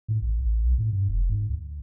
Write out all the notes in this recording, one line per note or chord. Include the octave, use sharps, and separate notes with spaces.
A2
A1
A1
B1
A2
G2
F1
G#2
D2